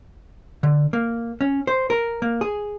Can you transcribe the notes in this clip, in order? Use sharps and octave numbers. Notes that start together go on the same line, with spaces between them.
D3
A#3
C#4
C5
A#4
A#3
G#4